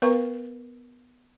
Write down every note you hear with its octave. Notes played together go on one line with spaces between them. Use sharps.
B3 A#4 B4 F5 A#5 C#6